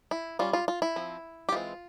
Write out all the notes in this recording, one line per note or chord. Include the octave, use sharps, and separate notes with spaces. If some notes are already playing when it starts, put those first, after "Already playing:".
E4
G3 C#4 F4
F4
F4
E4
F3 C4
G4
E3 G#3 C4 F4